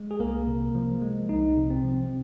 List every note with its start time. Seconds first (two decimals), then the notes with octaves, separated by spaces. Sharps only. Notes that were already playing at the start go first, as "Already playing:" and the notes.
Already playing: G#3
0.11 G#4
0.19 C2 A#3 A#4
0.47 C3
0.75 F3
1.02 G#3
1.29 C2 D#4
1.57 C3
1.70 C4
1.84 F3